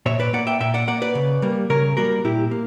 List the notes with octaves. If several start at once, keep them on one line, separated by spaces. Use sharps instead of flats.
A#2 C#5 E5
B4 D5
A#3 D5 F#5
E5 G5
A#2 E5 G5
D5 F#5
A#3 D5 F#5
B4 D5
C#3
G3 A#3
C#3 A#4 C#5
G3 A#3 F#4 A#4
A#2 E4 G4
A#3